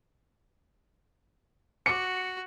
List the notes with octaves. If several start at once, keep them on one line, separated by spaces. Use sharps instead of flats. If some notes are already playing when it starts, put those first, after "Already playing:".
F#4 D6 C#7